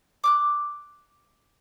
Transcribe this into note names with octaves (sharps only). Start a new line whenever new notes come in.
D6 F6 F#6